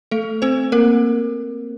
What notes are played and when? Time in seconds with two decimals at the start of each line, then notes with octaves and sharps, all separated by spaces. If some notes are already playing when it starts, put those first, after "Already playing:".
0.11 A3 A4
0.42 C4 C5
0.72 A#3 A#4